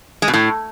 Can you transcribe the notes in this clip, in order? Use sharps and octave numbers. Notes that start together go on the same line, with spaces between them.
G#3
B2
A2